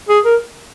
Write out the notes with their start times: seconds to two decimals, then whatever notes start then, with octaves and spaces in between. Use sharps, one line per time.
0.09 G#4
0.25 A#4